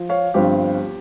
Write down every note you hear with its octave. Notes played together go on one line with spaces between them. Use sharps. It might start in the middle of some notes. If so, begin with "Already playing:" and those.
Already playing: F3
C#5 F5
G1 G2 F3 C4 G4